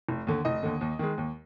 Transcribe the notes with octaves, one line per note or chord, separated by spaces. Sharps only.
F1
D#2 D3
F1 D#5
D#2 D3
D#2
D#3 G#3
D#2